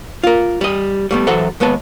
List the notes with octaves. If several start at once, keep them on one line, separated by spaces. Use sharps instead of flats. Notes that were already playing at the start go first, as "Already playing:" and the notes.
F4 A#4
G3 D#5
G3 A3 B3
E3 F#3 A4 C5 E5 F#5
D#2 G#3 B3 B4 A5